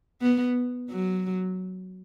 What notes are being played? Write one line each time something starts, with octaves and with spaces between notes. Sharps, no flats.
B3
F#3